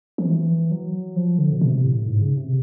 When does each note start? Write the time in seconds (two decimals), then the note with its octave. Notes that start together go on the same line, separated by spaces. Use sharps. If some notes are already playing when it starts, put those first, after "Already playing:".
0.18 F3
0.26 E3
0.71 F#3
1.16 F3
1.39 D3
1.52 B2
1.61 C3
1.84 A2
2.07 G#2
2.21 C#3
2.37 C3